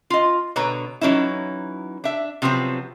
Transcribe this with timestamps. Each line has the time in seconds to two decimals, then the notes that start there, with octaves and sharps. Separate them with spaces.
0.10 F4 D#5
0.56 B2 D3 B4 C#5 A#5
1.01 E3 F#3 C#4 D#4 E4
2.04 D4 E5
2.42 C3 F3 F#3 B3 C4